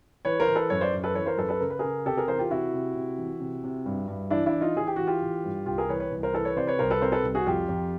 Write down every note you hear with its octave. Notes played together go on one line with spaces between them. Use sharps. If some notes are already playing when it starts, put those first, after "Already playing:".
E3 B4 C#5
A#4 C5
E3
A4 B4
F#2 B4 C#5
C5 D5
F#2
A4 B4
E3 B4 C#5
A#4 C5
F#2 A4 B4
A4 B4
C#3 A#4
B4
C#3 G#4 A#4
C3 G4 A4
G#4 A#4
E3 A#4 C5
F4 G4
C3 E4 F#4
C3
C3
E3
C3
C3
G2
G2
E3 D4 E4
D4 E4
E3
D#4 F4
E3 G#4
G4
E3 F#4
F4 G4
E3
G2
C2 F4 G4
G#4 A#4
E3 B4 C#5
B4 C#5
C2
A#4 C5
E3 A4 B4
B4 C#5
C3 C5 D5
B4 C#5
C2 A#4 C5
A4 B4
C3 A#4 C5
A4 B4
C2
F#4 G#4
F2 F4 G4
F2